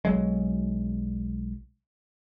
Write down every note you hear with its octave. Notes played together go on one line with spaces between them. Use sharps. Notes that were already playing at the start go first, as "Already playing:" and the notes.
B1 F#3 G#3